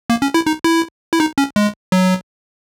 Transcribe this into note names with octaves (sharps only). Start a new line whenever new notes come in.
A#3
C#4
E4
D#4
E4
E4
D#4
C#4
G#3
F#3